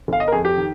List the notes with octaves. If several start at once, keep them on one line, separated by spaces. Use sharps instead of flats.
G1 F5
D#5
A#4
F2 G#4
G4
D#3